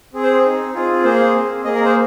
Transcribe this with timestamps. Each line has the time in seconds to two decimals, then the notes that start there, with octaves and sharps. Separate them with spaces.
0.13 C4 G#4
0.23 C5
0.43 C4 D#4 G#4
0.74 C4 F4 G#4
1.04 A#3 G#4 C5
1.34 C4 G#4
1.64 A#3 G#4 D#5
1.75 A#4
1.85 C5